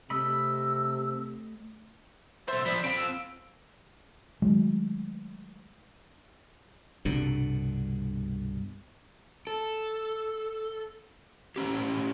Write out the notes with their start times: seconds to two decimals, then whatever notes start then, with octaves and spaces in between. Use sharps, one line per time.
0.10 C3 A3 D#5 B5 E6
2.48 B2 A4 C5 E5
2.65 F3 D4 B5
2.84 C4 F4 B5 D7
2.97 E6
4.42 D#3 F#3 G#3 A3
7.05 C2 G2 B2 D3
9.47 A4
11.56 A2 C#4 G4